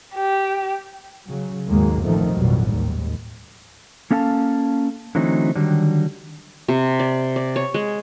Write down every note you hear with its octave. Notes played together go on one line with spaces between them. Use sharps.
G4
C#3 F#3
D#2 G#2 D#3 F#3 G#3 A#3
A1 E2 C3 D#3 F3 A3
A1 F2 B2 F#3 G3
D#2 G#2
A#3 C#4 A4 F5 G#5 A5
D3 E3 F#3 A3 C4 D#4
D3 D#3 F#3 G3
C3
D5
D5
C#5
G#3